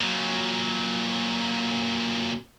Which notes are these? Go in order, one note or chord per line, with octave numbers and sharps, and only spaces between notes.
A#2 F#3